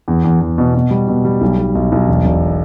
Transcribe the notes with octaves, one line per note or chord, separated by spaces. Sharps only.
E2
E2
E2
B2
B2
G3
B2
G3
B1
B1
B1
B1
E1
E1